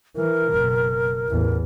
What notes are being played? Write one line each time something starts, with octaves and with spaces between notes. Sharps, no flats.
E3 A#4
F#1 B2
A1 E2